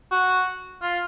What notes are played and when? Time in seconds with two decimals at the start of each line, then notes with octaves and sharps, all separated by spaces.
0.12 F#4
0.83 F4